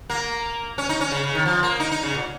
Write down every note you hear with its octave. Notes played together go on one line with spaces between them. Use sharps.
A#3
C#4
D#4
C#4
C#3
C#3
D#3
F3
A#3
D#4
D#4
C#3
A#2